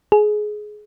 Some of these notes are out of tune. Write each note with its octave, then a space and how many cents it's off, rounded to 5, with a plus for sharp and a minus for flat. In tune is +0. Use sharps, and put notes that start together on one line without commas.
G#4 +20